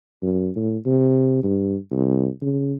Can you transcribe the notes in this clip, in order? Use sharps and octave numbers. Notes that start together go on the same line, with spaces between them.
F#2
A2
C3
G2
C2
C#3